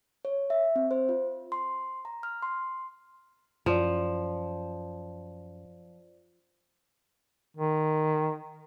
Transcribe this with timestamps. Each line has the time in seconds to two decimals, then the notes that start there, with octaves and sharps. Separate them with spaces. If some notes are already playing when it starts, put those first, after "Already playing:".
0.25 C#5
0.50 E5
0.76 C4
0.91 C5
1.09 F4
1.52 C6
2.05 A#5
2.23 F6
2.43 C6
3.66 F#2 F3 C5 D5
7.57 D#3